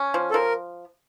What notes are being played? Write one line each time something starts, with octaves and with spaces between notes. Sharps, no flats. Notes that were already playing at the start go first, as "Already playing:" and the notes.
Already playing: C#4
F3
A4
F3 A#4